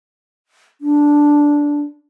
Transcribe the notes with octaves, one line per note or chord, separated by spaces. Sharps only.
D4